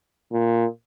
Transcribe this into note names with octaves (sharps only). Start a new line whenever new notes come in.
A#2